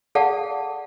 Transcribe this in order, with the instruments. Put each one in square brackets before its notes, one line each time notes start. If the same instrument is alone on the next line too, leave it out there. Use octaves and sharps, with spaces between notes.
[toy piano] G#4 A4 D5 F5 F#5 A5